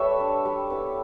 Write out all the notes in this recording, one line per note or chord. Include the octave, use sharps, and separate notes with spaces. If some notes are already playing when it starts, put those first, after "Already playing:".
Already playing: G3 A4 B4 C#5 E5
D4
G3
B3 E4